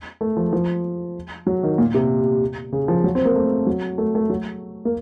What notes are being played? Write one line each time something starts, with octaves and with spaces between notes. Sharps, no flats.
A3
F3
F3
F#3
D#3
A#2
C3
C#3
F3
F#3
C4
A#3
A3
F#3
A3
A3
F#3
A#3